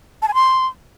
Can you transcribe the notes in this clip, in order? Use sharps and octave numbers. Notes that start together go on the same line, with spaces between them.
A5
G#5
C6